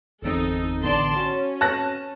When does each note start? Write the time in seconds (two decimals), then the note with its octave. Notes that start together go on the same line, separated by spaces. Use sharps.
0.22 G1 E2 C4 D#4 A4
0.83 A1 D3 B3 D5 A5 C6
1.16 C#4 F#4
1.61 A5 F#6 A#6